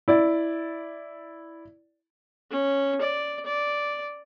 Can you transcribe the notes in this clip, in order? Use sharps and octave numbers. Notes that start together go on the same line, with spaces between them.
E4 D5
C#4
D5
D5